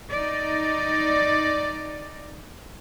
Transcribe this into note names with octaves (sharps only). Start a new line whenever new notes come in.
D#4 D5